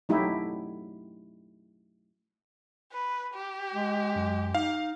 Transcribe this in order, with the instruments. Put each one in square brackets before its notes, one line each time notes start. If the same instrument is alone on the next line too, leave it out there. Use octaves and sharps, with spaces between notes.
[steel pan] F#3 A3 D#4 E4 G4
[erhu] B4
G4
[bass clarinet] G#3
[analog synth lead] F#2
[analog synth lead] D#4 [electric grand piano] F5